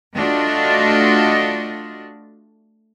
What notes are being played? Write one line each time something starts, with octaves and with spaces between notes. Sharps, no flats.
A3 D4 F4 F#4 D#5